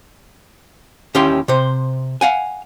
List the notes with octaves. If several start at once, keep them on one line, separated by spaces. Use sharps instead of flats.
D#2 D#3 C#4 E4 G4 C6
C3 C5
F5 F#5 G#5